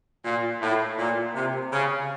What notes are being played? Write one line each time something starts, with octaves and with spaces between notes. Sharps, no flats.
A#2
A2
A#2
C3
C#3